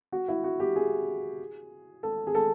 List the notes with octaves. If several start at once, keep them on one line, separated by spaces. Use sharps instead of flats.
F#4
E4
F#4
G4
G#4
A4
G#4
A4